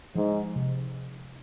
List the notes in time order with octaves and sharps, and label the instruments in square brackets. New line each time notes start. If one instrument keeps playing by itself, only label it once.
[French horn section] G#2 [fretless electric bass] F3
[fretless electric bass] C3